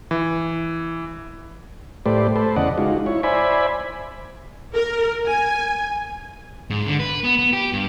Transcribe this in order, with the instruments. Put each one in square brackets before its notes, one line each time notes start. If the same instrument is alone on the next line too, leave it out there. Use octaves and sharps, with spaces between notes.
[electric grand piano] E3
[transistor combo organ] A2 A3 G4 B4 C5 D5
A4 B4 C5
E2 C#3 D5 D#5 F#5
G#3 D#4 F4 F#4
E4 C#5
C5 D5 E5 G#5 B5
[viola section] A#4
G#5
[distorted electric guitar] G#2
D3
B4
B3
B3
G4
G2